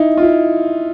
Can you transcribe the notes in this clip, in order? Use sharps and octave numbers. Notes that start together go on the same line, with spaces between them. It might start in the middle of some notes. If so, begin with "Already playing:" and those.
Already playing: D#4 E4
F4
E4